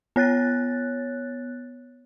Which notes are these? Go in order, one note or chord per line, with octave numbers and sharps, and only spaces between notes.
B3 C#5 F#6 A6